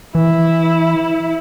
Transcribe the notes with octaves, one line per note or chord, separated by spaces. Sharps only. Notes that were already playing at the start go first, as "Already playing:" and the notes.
E3 E4